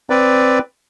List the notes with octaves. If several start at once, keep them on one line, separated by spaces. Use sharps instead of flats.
C4 B4 D5